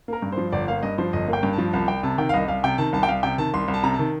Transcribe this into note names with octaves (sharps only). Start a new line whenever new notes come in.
A#3 A#4
G2
C5
F3
G1 D5
A#3 F5
G2 D#5
F3 C5
G1 D#5
A#3
G5
G2
A5
F3
C2 A5
C2 G5
C3 A5
D#3 G5
F5
C2 D#5
C2 F5
C3 G5
D#3 A5
C2 A5
G5
C2 F5
C3 G5
D#3 A5
C2 C6
C2
A5
C3 A#5
A5
D#3